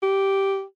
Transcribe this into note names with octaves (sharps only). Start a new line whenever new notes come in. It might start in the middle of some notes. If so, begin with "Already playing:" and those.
G4